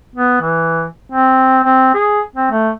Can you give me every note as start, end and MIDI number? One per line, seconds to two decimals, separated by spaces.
0.16 0.39 59
0.41 0.86 52
1.12 1.60 60
1.64 1.91 60
1.94 2.21 68
2.36 2.50 60
2.51 2.71 57